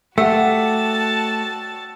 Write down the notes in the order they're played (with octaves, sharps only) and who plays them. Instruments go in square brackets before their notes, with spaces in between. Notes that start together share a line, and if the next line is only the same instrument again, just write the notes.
[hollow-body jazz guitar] A3 [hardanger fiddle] F#4 A5 [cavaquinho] G4 D5 F#5 [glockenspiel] E6